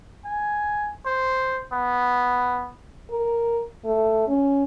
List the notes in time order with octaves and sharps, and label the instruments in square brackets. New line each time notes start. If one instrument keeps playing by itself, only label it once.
[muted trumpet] G#5
C5
B3
[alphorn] A#4
A3
C#4